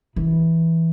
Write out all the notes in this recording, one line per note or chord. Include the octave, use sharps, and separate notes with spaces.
E3